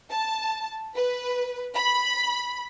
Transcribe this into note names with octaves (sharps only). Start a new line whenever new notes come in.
A5
B4
B5